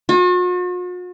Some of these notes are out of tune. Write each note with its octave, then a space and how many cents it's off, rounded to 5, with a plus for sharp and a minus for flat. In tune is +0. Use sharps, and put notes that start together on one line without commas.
F#4 -45